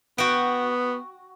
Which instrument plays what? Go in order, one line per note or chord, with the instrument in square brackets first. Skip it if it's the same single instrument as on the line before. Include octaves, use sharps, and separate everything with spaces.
[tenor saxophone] B3 [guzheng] F#4 G5